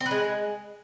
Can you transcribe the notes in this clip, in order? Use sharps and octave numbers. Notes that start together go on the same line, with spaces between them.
C4
B4
G#3